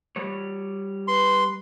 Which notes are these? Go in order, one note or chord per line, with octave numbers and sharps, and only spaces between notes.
G3 C#5
B4 C6